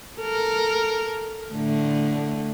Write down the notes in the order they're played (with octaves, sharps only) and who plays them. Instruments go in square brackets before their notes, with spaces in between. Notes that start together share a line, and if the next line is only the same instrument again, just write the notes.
[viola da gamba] A4 A#4
A2 D3 A3